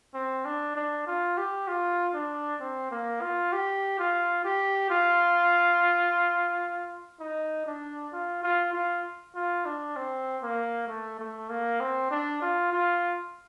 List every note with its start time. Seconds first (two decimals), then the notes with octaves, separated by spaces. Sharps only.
0.15 C4
0.45 D4
0.76 D4
1.07 F4
1.38 G4
1.68 F4
2.14 D4
2.60 C4
2.92 A#3
3.22 F4
3.53 G4
3.99 F4
4.45 G4
4.90 F4
7.20 D#4
7.67 D4
8.13 F4
8.43 F4
8.73 F4
9.35 F4
9.65 D4
9.96 C4
10.43 A#3
10.88 A3
11.19 A3
11.49 A#3
11.80 C4
12.11 D4
12.42 F4
12.73 F4